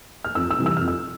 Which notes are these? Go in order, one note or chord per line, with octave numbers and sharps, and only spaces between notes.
F6
F2 E6
E6
C3 E3 G3
E6
F2 F6
E6